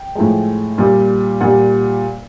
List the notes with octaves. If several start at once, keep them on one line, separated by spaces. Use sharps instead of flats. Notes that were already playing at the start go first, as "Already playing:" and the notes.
Already playing: G5
A2 F3 G#3
A#2 G3
A#2 G3 F#5